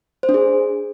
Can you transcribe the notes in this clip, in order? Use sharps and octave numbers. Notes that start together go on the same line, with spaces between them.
C5
D4
G#4